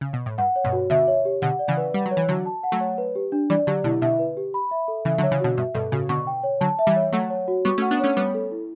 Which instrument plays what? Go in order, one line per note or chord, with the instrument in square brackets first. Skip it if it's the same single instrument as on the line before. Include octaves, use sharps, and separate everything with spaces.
[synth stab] C#3
B2
A2
[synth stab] G2 [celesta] F#5
[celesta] C#5
[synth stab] G2 B2
[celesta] F#4
[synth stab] B2 D3 [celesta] E5
[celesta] C#5
G4
[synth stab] B2 D3 [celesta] F#5
[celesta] D5
[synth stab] C#3 E3
[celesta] B4
[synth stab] G3 [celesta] F#5
[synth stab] F#3
[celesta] C#5
[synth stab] E3
[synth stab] D3 F#3 [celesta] F#4
[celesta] A5
F#5
[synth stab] F#3 A3
[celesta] C#5
B4
G4
D4
[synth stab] E3 G3 [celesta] D5
[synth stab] D3 F#3 [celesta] G4
[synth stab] B2 D3 [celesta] E4
[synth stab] B2 D3 [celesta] E5
[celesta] B4
G4
B5
E5
A4
[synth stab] C#3 E3 [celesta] E5
[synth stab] D3 F#3
[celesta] C#5
[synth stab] C#3 E3
[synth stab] B2 D3 [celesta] F#4
[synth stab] G2 B2 [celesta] E5
[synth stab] G2 B2 [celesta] A4
[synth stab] A2 C#3 [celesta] F#4
[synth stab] B2 D3 [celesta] C#6
[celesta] G5
C#5
[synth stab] D3 F#3 [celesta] A5
[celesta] E5
[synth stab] E3 G3
[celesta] C#5
[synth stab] F#3 A3 [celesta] F#5
[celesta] C#5
F#4
[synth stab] G3 B3 [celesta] C#6
[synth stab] A3 C#4
[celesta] F#5
[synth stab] B3 D4
[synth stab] A3 C#4 [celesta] C#5
[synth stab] G3 B3 [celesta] C#5
[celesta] A4
E4